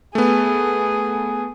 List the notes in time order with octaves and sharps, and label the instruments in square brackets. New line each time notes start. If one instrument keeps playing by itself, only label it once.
[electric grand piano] A3 B3 [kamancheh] G#4